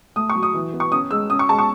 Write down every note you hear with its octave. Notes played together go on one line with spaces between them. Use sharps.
A3 D#6
C#6
F#3
D#6
E3
B3
C#6
C#4 D#6
G#3 E6
C#4 D#6
C#6
G#3 A5
C#6